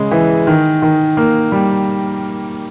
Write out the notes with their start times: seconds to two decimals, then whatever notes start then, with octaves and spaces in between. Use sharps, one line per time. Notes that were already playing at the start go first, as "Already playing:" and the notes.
Already playing: C#3 G#3
0.11 E3
0.47 D#3
0.82 D#3
1.17 A#3
1.52 G3